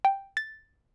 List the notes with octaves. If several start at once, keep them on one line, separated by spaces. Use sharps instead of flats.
G5
A6